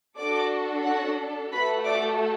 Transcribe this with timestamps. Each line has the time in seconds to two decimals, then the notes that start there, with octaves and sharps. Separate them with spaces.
0.17 D4 F#4 A4 D5 D6
0.84 F#4 F#5
1.51 A3 F#4 A4 B4 B5
1.84 D5 D6